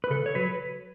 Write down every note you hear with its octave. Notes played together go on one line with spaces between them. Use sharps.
B4
C#3 A4
C#5
F#3 B4